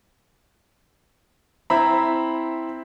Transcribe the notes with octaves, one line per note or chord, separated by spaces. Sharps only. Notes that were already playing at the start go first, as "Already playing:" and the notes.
C4 E4 E5 A#5 B5